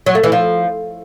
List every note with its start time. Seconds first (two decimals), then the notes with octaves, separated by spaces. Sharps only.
0.06 F#3
0.15 A3
0.23 E3
0.32 F3